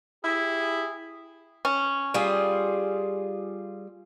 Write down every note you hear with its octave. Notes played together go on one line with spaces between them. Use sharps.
E4 G4 G#4
C#4
G3 F4 G#4